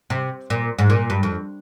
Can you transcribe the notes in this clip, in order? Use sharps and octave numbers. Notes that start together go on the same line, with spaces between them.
C3
A#2
G#2
A#2
G2
F2